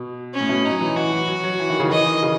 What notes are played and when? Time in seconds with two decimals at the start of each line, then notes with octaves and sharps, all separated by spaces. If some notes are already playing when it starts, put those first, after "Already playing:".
Already playing: B2
0.34 C#4
0.41 A2
0.49 B2
0.65 D#4
0.71 F#3
0.81 E3
0.96 E3 F#4
1.12 E3
1.28 F#3
1.44 F#3
1.60 E3
1.70 D#3
1.80 C#3
1.85 D#3
1.91 E3 D#5
2.06 D#3
2.22 C#3